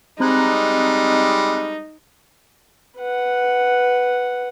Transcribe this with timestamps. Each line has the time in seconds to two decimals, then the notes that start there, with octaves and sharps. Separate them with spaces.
0.20 G3 G#3 C4 D#4 A#5 F#6
2.98 B4 F#5